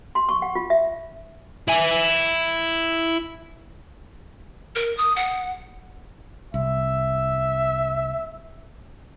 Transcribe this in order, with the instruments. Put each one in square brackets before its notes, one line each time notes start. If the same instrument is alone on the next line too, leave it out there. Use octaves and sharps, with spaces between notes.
[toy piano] C6
C#6
F#5
F4
E5
[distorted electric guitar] E4 G#5
[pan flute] A#4
D#6
F#5
[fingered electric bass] C2 [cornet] E5